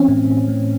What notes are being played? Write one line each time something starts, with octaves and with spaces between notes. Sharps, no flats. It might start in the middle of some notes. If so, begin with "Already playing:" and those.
Already playing: E3 C4 C#4
A2
A2